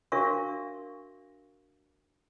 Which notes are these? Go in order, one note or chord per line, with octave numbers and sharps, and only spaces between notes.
D4 F#4 A#4 E5 F5 C#6